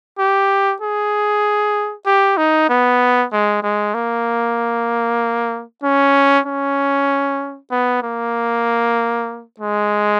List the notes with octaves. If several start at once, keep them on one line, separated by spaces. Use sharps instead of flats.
G4
G#4
G4
D#4
B3
G#3
G#3
A#3
C#4
C#4
B3
A#3
G#3